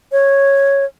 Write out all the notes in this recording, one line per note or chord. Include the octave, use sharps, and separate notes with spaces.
C#5